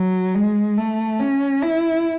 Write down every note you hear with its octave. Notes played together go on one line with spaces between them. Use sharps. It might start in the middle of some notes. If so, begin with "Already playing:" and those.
Already playing: F#3
G#3
A3
C#4
E4